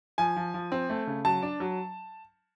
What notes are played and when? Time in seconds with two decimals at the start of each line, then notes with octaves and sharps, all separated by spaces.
0.18 F3 G#5
0.36 F3
0.54 F3
0.72 C4
0.90 A3
1.07 C#3
1.25 F#3 A5
1.42 D4
1.60 F#3